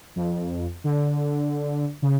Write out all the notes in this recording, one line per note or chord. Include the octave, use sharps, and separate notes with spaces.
F2
D3
C#3